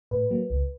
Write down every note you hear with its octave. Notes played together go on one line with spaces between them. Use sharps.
A2 B4
F#3 A#3
C#2